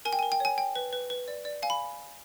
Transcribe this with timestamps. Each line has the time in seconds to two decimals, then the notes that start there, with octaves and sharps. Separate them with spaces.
0.05 A#4 G#5
0.13 G5
0.19 A#4 G#5
0.32 G5
0.40 C#5 G#5
0.58 G5
0.75 B4
0.93 B4
1.10 B4
1.28 D5
1.45 D5
1.63 F5 G#5
1.70 B5